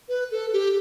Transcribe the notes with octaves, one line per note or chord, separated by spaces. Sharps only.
B4
A4
G4